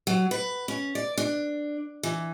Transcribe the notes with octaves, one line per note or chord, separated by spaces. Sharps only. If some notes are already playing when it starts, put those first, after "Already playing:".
F#3
B4
C#4
D5
D4
E3